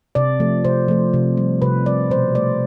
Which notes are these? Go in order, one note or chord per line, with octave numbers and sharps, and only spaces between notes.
C3 D5
F3 A3
C3 C5
F3 A3
C3
G3
C3 B4
G3 D5
B2 C5
A3 D5